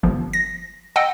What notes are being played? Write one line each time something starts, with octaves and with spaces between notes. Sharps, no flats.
G1 F3
A#6
D#5 F#5 G5 E6